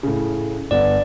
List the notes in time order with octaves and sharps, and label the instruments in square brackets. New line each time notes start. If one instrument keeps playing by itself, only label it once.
[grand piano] A2 C#3
[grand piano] G1 B3 [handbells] D5